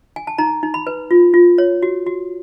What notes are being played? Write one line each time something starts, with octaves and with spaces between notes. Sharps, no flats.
G#5
A5
D#4 A#5
D#4
B5
B4
F4
F4
C#5
F#4
F#4